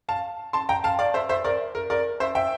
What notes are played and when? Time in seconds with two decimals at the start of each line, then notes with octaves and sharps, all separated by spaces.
0.09 F5 A5
0.53 A5 C6
0.69 G5 A#5
0.84 F5 A5
0.99 D5 F5
1.14 C5 E5
1.29 C5 E5
1.44 A#4 D5
1.75 A#4
1.90 A#4 D5
2.20 C5 E5
2.35 E5 G5